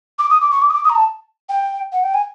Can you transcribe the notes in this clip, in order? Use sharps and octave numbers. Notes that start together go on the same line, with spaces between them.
D6
D#6
D6
C#6
D6
D#6
D6
D#6
A#5
A5
G5
F#5
G5
G#5